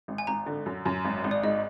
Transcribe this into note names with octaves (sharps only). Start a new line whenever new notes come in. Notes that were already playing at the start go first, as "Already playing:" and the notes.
G#1
G#5
G#1 A#5
D3
F#2
F#2
G#1
G#1
D5
G#2 D#5